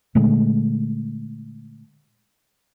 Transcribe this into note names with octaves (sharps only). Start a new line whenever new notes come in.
A#2 D3 G#3 A3